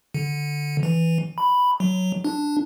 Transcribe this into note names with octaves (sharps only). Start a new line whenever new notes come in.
D3
E3
B5
F#3
D4